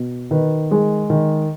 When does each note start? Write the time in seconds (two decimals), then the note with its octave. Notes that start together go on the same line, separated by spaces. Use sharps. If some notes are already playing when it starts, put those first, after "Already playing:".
Already playing: B2
0.31 D#3 B4
0.71 G#3
1.10 D#3